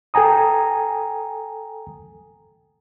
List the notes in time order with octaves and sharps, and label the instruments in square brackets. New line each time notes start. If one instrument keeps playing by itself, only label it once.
[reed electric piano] A4 G5 G#5 A#5 D#6